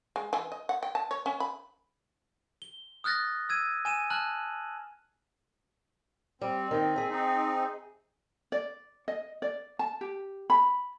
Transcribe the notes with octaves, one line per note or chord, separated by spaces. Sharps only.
G#3
E3
D#5
F#5
G5
A5
C#5
C#4
B5
G7
D#6 F6 F#6 A6 A#6
E6 G#6 D#7
G#5 D#7 E7
A5 F6 F#6 F#7
G3 C4
D#3 D#4
G#4 E5
C4 D#4
D5
D#5
D5
A5
G4
B5